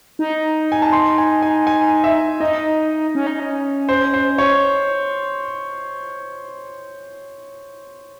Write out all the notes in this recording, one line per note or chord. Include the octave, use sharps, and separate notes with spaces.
D#4
G#5
A5
C6
G#5
G#5
G#5
E5
D#4 D#5
C#4
D#4
C#4
C5
C5
C#5